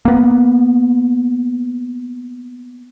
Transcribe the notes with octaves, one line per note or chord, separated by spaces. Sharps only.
A#3 B3